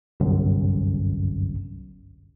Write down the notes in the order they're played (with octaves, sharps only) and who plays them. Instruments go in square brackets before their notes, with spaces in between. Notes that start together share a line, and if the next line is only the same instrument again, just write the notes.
[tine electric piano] G1 C2 F#2